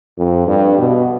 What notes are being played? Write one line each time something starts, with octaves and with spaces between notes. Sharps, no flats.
F2
G2
B2